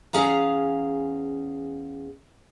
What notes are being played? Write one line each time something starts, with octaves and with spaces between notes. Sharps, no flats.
E2 C#4 G#4 F5 A#5